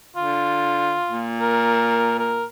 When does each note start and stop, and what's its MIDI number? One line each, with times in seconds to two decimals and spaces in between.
0.16 0.98 50
0.16 1.26 65
1.10 2.48 46
1.40 2.19 70
2.19 2.45 70